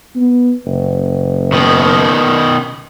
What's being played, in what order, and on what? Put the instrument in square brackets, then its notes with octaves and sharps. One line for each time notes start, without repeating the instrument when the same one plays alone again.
[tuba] B3
F#1
[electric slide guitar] B2 D#3